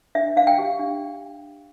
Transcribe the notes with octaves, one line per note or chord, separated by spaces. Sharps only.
D4 E5
D4 F5
G5
G4
D4